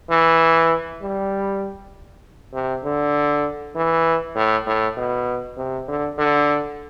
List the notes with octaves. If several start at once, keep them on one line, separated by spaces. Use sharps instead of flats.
E3
G3
C3
D3
E3
A2
A2
B2
C3
D3
D3